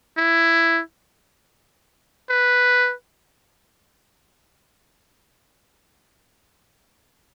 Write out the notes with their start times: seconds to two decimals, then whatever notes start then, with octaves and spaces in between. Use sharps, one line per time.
0.17 E4
2.30 B4